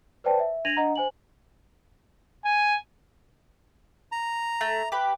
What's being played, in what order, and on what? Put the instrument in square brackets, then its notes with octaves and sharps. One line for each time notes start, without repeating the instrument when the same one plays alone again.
[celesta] B4 C5 D5 G5 A5
E5
D4 G#6 A#6 D#7 F7 F#7
D4 D#5 F#5 A#5
C5 G#5 F#7
[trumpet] G#5
[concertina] A#5
[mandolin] A3
G4 B4